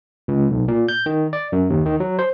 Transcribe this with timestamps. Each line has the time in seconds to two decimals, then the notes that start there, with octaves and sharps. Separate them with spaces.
0.28 C#2
0.50 B1
0.68 A#2
0.89 G6
1.06 D#3
1.33 D5
1.52 F#2
1.70 D#2
1.86 D#3
2.00 F#3
2.19 C5